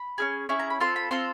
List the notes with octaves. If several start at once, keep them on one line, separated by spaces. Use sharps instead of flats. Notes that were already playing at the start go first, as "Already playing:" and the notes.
Already playing: B5
C#4 E4 G#4
C#4 E4 G#4
A#5
B5
C4 F4 A4 C6
B5
C4 F4 A4 C6